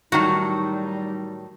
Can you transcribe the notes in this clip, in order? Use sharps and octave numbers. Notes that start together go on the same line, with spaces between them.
A2 D#3 F#3 G3 D#4 F#4